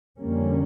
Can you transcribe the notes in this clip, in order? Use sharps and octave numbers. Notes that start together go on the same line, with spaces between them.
F2 D3 G3 A#3 C#4